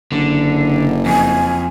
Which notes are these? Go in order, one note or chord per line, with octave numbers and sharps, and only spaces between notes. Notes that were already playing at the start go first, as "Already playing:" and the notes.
F#1 D3
F2 G#5